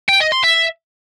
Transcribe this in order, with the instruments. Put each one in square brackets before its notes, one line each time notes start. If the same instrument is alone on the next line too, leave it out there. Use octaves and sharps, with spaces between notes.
[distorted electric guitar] G5
D#5
C6
E5